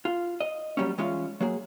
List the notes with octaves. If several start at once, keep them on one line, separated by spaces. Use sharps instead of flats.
F4
D#5
F#3 G3 A#3 C#4
E3 G#3 C#4 F4
F#3 A#3 G#4